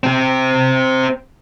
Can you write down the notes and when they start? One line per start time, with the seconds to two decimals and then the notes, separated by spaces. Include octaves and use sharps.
0.04 C4 G4